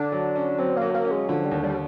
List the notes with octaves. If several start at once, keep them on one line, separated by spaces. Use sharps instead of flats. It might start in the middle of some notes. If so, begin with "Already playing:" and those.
Already playing: D3 D4
F#3
C#4
F#3 C4
A#3
F#3
A#3
C#4
G#3
D3 F3
G3
D#2
G3